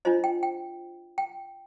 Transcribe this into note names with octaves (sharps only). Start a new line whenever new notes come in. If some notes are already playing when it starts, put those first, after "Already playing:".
D4 F4 C5 D#5
G5
G5
G5